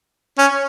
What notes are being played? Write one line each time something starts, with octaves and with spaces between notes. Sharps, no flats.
C#4